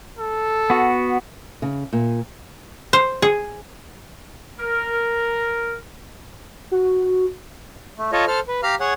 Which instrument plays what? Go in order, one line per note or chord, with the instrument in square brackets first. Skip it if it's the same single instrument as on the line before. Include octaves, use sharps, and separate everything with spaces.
[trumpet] A4
[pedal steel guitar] B3 F#4
[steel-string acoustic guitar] C#3
A#2
[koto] C5
G#4
[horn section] A#4
[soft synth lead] F#4
[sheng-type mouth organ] A3
F4 A4 C#5 D#5
A4 C5 F6
B4
G4 F5 A#5 F6
G#4 C#5 F#5